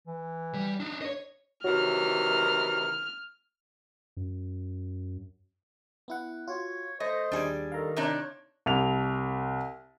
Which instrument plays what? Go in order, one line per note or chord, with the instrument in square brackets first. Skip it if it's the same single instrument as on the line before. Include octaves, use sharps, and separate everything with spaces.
[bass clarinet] E3
[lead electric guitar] G3
D4 D#4
C#5 D#5
[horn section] C3 D#3 E3 [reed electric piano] F#4 C#5 [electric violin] F6
[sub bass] F#2
[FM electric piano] B3 E4 F#5
[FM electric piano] F4 F#4 [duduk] C#5
[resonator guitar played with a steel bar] A3 [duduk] C5 [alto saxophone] D#5 [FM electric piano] A#6
[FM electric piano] D#2 G#4 G#5 [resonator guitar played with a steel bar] G3 D4
[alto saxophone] D#3 [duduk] A4 [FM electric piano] F5 A#5
[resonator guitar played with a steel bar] C3 D4 D#4 [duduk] C#5
[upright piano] C2 F7